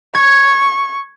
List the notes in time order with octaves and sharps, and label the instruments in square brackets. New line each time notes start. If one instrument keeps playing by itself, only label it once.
[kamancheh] C#6 [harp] G#6